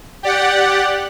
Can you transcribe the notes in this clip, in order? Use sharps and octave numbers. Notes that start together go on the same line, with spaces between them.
G4 D5 F#5